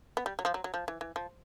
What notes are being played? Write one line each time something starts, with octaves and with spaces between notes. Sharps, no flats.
B3
G3
F#3
F3
F#3
F#3
F3
E3
E3
F3